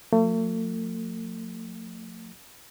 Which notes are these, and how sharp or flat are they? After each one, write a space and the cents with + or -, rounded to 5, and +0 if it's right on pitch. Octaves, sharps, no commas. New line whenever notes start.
F3 +35 A3 +40